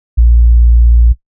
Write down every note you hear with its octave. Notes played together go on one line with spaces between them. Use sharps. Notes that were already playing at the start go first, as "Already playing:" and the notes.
A#1